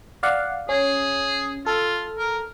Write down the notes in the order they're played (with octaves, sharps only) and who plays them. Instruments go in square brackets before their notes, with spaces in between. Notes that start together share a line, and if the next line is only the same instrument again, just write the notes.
[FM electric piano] D5 F5 F#5
[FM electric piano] C#4 [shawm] G#4
[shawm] F4 [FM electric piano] A4
[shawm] A#4